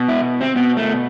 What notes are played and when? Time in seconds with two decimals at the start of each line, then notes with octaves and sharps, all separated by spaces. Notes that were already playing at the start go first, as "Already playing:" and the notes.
Already playing: B2
0.09 E4
0.41 C4
0.56 B2 B3
0.77 A3